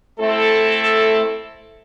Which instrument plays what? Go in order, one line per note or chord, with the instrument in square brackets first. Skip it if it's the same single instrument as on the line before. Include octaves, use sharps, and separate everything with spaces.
[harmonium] A3 [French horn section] C4 E4 A4